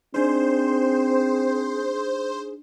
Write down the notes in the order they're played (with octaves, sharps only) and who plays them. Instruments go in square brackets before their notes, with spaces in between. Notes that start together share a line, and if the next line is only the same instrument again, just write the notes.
[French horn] C4 [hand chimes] D4 D#4 [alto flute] G#4 [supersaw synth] C5